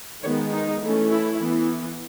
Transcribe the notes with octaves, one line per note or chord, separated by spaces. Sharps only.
D#3 G#3 B3 C#5
D#4
E3 A3 C#4
E4
E3 B3